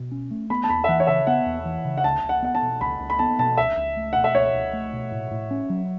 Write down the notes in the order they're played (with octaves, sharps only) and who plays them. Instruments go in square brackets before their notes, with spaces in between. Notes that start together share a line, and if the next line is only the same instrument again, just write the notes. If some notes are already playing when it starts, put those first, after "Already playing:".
Already playing: [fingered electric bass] B2
C#4
A3
[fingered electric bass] B3 [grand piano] B5
[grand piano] A5
[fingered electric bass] E2 [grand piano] B5
[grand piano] E5
[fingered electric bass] E3 [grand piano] F#5
[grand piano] C#5
[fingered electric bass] C#3 [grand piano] E5
[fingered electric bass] B3 [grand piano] F#5
[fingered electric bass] E2
E3
C#3
[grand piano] F#5
[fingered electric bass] C#2 [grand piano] A5
[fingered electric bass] C#2
[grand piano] F#5
[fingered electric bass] B3 [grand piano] F#5
[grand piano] A5
[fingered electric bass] B2
[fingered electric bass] C#2 [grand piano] B5
[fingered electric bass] C#2
[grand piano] B5
[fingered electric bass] B3 [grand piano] A5
[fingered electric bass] B2 [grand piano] A5
[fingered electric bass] C#2 [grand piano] E5
[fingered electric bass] C#2
A3
[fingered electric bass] B2 [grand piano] F#5
[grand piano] E5
[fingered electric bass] C#2 [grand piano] C#5
[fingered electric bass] C#2
A3
B2
A2
A2
C#4
F#3